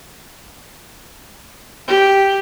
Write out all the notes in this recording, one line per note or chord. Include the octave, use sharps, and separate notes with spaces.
G4